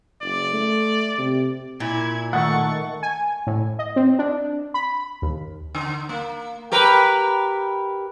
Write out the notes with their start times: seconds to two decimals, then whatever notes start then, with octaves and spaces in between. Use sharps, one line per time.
0.22 F#1 D5
0.53 A3
1.18 C3
1.80 A#2 E4 G#6
2.33 D#3 A3 F#5 C#6 A6
3.03 G#5
3.47 A2
3.79 D#5
3.96 C4
4.19 D4
4.74 B5
5.22 D#2
5.75 D3
6.09 A#3
6.72 G4 A#4 B4